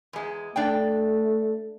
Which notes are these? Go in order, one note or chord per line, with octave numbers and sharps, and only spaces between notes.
E2 G#3
A3 D4 D5 G5